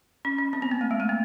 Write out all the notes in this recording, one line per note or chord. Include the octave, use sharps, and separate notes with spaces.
C#4
C#4
C4
B3
A#3
A3
G#3
A3
A#3